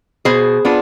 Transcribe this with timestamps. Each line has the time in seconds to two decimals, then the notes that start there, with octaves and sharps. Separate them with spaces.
0.25 B2 G#4 C5
0.65 B3 D4 F4